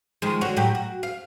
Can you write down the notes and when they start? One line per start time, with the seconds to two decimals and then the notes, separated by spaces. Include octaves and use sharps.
0.22 D#3 F3 G#3
0.41 D3 F#4 C#5
0.57 A2 F#3 G4
0.75 F#4
1.03 F5